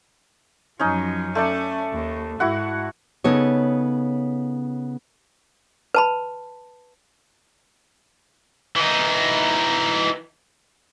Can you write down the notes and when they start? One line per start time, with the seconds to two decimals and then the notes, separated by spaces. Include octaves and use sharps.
0.79 F#2 F3 C#4 D#4 D#5
1.35 A3 C#4 D5 A5
1.93 D#2
2.40 G#2 E4 F#4 F#5
3.24 C#3 B3 D#4 A4 C#5
5.94 B4 A5 B5
8.76 E3 D#4